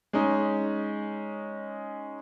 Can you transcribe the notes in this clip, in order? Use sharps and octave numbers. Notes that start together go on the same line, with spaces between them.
G#3 C#4 D#4